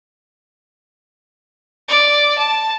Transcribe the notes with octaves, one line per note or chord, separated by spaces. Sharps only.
D5
A5